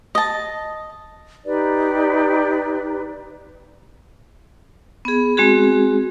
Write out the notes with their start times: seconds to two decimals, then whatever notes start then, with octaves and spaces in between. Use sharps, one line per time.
0.15 D#5 A5
1.45 D#4 G4 B4 D5
5.05 B3 G#4
5.37 G#3 C4 F#4 G#4